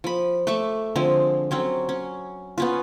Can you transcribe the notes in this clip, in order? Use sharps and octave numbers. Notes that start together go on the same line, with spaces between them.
F3 B5
A3 E5 C#6 D6
D3 F3 G#3 C4
F#3 C4 C#4
C#4
B3 C#4 F4